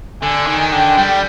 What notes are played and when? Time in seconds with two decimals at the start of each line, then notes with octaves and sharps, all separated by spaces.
0.22 D3 G#5
0.47 D#3
0.73 D3 G5
0.97 G3